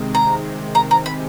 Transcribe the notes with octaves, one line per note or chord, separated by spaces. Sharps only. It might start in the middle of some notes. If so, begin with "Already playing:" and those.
Already playing: C3 D#3 G#3 C4
A#5
A#5
A#5
B5